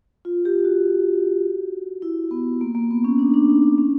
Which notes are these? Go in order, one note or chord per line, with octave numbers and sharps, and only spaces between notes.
F4
G4
F#4
E4
B3
A#3
A#3
B3
C#4
D4
D4
D#4
D4
C#4